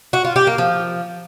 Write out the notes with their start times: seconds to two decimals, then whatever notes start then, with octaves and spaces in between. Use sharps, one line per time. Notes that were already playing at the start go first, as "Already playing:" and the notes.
0.13 F#4
0.24 F4
0.36 G4
0.47 A#3
0.58 F3